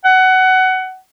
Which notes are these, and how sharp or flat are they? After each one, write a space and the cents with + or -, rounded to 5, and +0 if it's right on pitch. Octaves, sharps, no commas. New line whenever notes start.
F#5 +20